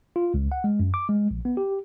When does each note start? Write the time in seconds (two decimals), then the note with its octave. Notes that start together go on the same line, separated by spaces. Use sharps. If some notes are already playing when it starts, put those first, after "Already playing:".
0.16 F4
0.34 C#2
0.52 F#5
0.64 G#3
0.80 F#2
0.94 D6
1.09 G#3
1.31 A#1
1.45 B3
1.57 G4